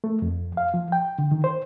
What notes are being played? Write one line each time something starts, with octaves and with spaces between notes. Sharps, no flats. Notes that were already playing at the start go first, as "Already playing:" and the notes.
A3
F2
F5
F3
G5
D3
D#3
C5